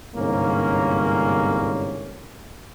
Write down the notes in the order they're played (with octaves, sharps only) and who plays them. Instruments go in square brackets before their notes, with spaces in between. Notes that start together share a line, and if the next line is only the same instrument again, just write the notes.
[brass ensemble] G1 C2 G#2 A#3 C#4